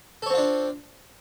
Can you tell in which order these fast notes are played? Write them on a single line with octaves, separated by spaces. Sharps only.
A4 C#5 C4 F4 D4